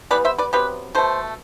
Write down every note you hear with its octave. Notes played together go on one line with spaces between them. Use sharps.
E3 G3 B3 B4 D5
C5 E5
B4 D5
C3 F#3 B3 G4 B4
B2 A3 A4 C5